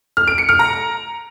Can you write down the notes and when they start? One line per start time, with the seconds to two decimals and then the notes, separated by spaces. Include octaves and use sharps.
0.17 F6
0.28 D7
0.38 C#7
0.49 F6
0.59 A#5